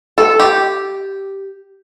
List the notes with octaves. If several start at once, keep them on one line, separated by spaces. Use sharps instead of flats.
A4
G4